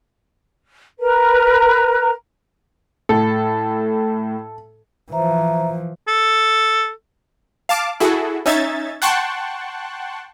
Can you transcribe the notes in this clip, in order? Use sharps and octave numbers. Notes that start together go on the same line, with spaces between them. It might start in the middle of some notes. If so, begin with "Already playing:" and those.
A#4 B4 A#5
A2 A4
E3 F3 C5 E5 A#5
A4
F5 A5 D6
E4 F#4 G#4 A4
C#4 D#4 E5 G#6 A6
F#5 G5 A5 C6 C#6 F#6